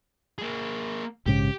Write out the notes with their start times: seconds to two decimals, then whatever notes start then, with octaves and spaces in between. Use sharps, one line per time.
0.38 A#3 G#4
1.26 A#1 G#2 C#3 G4